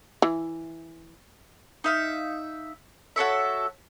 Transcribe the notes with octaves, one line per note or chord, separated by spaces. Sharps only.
E3
D#4 E5 F5
F#4 A4 C#5 E5